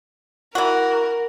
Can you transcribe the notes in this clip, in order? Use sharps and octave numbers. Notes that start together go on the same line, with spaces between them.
E3 F#4 A#4